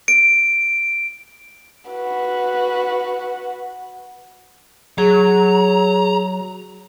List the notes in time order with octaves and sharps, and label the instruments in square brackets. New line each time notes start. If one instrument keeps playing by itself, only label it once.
[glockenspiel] D7
[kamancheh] F#4 B4
[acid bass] F#3 [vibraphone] G#4 [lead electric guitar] A#5